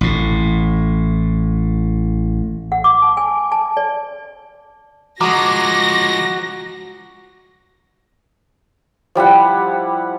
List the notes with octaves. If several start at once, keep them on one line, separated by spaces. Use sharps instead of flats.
A1 A2
F#5
D6
A5
G#5
A5
D5
F3 G#3 F#4 A#5 D6 D#6 A#6
F3 G3 E4 F#5